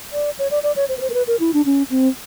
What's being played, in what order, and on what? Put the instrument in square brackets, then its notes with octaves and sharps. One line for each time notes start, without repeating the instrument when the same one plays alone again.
[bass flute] D5
C#5
D5
D5
C#5
C5
B4
C5
A#4
B4
A#4
E4
D4
C#4
C4